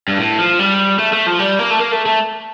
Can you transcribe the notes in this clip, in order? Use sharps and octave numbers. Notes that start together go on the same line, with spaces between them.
G2
A2
F3
G3
A3
A3
F3
G3
A#3
A3
A#3
A3
A3